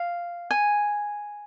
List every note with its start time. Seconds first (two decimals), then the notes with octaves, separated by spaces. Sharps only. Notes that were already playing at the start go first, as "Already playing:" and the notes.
Already playing: F5
0.51 G#5